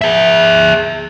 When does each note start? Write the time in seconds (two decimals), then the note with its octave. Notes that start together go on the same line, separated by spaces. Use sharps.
0.01 G#4 E5